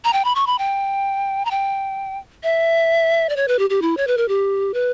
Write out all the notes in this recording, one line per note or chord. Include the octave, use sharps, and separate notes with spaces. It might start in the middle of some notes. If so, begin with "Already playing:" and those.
A#5
G5
B5
C#6
B5
G5
A#5
G5
E5
D5
C#5
B4
G4
G4
E4
C#5
B4
A#4
G4
B4